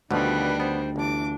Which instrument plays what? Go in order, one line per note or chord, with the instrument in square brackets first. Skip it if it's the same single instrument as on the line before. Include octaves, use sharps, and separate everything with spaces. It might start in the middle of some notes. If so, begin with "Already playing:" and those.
[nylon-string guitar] D2 [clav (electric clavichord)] B2 D3 F3 [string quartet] D#3 G3 D4 [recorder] B4
[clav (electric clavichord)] B3 [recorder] C5
[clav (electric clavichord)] G1 [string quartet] E3 D6 [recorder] D4